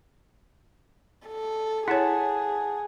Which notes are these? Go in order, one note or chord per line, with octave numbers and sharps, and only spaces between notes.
A4
E4 G#4 C#5 F#5 A5